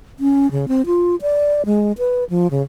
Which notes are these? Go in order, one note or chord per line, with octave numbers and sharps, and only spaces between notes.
C#4
C#3
C4
F4
D5
G#3
B4
F3
C#3